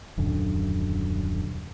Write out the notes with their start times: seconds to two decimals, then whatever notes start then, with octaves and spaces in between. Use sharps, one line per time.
0.18 D#1 F#2 D3